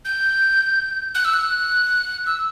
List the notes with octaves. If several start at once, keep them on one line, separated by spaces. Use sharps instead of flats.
G6
F#6
E6
F#6
E6